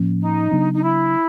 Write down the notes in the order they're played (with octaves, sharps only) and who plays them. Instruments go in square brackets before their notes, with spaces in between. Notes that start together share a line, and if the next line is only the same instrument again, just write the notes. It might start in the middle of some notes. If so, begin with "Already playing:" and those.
Already playing: [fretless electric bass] A2 F3 A#3 C#4
[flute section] D#4
[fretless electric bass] C#3 F#3 B3 D4
[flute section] D#4
E4